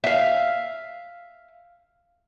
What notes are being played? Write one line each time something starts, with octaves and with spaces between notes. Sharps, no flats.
E5 F5